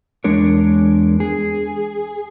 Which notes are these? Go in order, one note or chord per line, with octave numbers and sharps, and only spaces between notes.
E2 G#3 D4 A#4 C#5
G#4